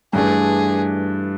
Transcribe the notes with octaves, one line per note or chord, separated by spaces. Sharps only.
G2 E3 A3 D4 G#4